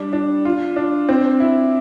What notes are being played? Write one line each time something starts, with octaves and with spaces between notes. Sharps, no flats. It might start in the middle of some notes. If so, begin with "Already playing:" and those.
Already playing: G3 D4
D4
F4
D4
C4
E4